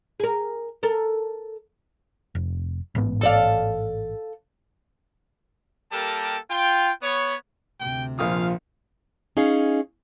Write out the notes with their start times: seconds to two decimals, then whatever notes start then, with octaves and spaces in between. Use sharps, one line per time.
0.20 G#4 A#4
0.83 A4 A#4
2.35 F1
2.95 A1 G#2 B3
3.21 A4 D5 F5
5.92 G3 A#3 G4 A4 A#4 A5
6.51 F4 G5
7.03 B3 C#5
7.80 D2 C3 G5
8.19 A#1 F3 F4 F5 D#6
9.37 C#4 D#4 G#4 F5